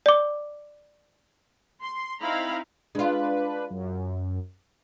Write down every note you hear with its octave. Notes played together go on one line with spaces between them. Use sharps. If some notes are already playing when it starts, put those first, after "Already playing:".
D5 D6
C6
C4 D#4 E4 F5 A#5 B5
G#3 D4 F4 B4
F#2